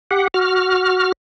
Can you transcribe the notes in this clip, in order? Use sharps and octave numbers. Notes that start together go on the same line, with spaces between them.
G4 F#5
F#4 F6